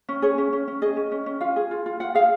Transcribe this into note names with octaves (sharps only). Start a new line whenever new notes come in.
C#4
G#4 C#5
C#4
C#4
C#4
G#4 D#5
C#4
C#4
C#4
F4 F5
G#4
F4
F4
F4 F#5
G#4 F5